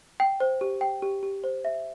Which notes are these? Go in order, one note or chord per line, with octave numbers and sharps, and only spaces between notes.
G5
C5
G4
G5
G4
G4
C5
E5